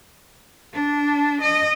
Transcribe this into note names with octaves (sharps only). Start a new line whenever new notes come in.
D4
D#5